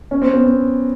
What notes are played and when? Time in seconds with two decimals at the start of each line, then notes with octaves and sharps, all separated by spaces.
0.11 C#4
0.22 C4
0.34 B3
0.44 C4